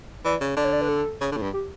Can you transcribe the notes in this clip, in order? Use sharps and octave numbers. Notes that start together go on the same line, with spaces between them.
E3 D5
C#3
D3 D5
C#5
D5
B4
A4
C#3
D3
A2
G2
G4